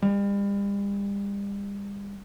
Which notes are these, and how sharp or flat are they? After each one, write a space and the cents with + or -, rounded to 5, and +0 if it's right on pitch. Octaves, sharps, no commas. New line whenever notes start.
G3 +40